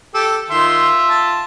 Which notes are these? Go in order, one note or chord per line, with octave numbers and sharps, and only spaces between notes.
G4 A4
D#3 F4 E5 C6
A5